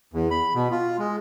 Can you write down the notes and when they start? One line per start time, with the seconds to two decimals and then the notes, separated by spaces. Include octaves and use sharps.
0.14 E2
0.31 B5
0.55 B2
0.71 F4
0.99 G#3